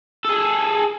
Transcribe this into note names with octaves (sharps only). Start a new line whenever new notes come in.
G#4 A4